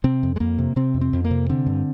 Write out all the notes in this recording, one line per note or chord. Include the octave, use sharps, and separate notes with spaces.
C3 C4
F2
G#3
F2 A#3
C3
C3 C4
F2
C4
F2
A#3
C3
D3 C4
G2